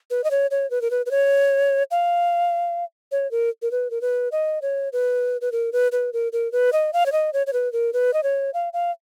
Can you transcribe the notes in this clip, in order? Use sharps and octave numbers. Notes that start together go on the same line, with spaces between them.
B4
D#5
C#5
C#5
B4
A#4
B4
B4
C#5
F5
C#5
A#4
A#4
B4
A#4
B4
D#5
C#5
B4
B4
A#4
B4
B4
A#4
A#4
B4
D#5
F5
C#5
D#5
C#5
C#5
B4
A#4
B4
D#5
C#5
F5
F5